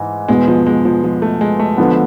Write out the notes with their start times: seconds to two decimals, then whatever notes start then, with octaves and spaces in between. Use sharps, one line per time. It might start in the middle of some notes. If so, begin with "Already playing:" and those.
Already playing: G#2 E3
0.28 E2 B2 G#3 B3
0.48 F3
0.67 G#3
0.85 F3
1.04 F3
1.22 A3
1.41 G#3
1.59 A3
1.78 D3 F3 B3